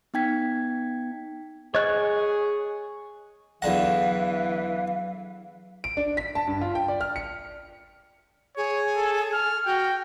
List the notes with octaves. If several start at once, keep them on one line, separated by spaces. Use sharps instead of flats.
B3 D#4 G5 G#6 B6
G#4 C#5 D#5 F#6
E2 D3 E3 F#3 F5 F#5
D7
D4
B6
A5
G2
F4
G5
D5
F6
C#7
G#4 C#5
A4
F6
F#4 G5